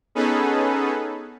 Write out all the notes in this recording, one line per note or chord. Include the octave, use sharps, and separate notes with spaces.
B3 C#4 D#4 G#4 A4 B4